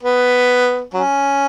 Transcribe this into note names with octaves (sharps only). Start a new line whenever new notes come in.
B3
F#3 C#4